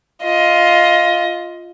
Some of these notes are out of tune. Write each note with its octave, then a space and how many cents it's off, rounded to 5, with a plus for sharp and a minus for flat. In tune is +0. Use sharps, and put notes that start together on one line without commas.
F4 +0 D#5 +15